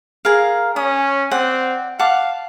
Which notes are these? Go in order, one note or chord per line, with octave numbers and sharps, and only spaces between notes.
G#4 A#4 F5
C#4 D#6
C4 D5 F#5
F5 F#5 A5 D6